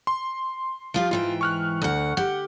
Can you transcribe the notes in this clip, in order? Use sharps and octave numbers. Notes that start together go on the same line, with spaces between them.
C6
F3 F4 G4
G#2 E3 F4 G5
C#6 F6 F#6
D2 F#5
G4 F#5